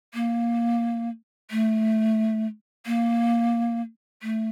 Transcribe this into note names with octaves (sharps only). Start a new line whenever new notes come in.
A#3
A3
A#3
A3